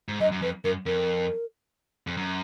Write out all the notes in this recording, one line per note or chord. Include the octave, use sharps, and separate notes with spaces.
G#2
F#2 D#5
F#2
F2 B4
F#2 A#4
F2 A#4
F2
F#2